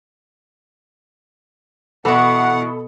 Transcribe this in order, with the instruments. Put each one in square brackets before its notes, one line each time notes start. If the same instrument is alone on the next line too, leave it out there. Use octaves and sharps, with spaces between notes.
[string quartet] B2 [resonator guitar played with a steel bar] E3 E4 F#4 [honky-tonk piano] A4 B5 D#6 [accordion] F#5